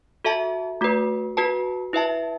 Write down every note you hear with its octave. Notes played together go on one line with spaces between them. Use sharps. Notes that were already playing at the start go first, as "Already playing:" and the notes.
F#4 A4 E5 A5
A3 F#4 B4
F#4 B4 A5
E4 B4 E5 A5